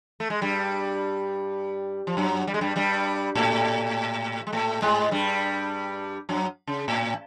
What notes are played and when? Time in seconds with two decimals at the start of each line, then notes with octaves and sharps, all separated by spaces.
0.20 A3
0.30 G#3
0.41 G2 G3
2.07 F3
2.17 F#2 F#3
2.47 G3
2.54 G#3
2.61 G2 G3
2.76 G2 G3
3.35 A2 A3
4.47 G#3
4.53 A2 A3
4.82 G#2 G#3
5.11 G2 G3
6.29 F#2 F#3
6.67 C#3
6.88 A2